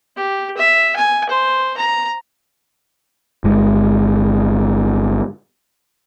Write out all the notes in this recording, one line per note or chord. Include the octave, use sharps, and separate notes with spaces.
G4
E5
G#5
C5
A#5
G1 G#3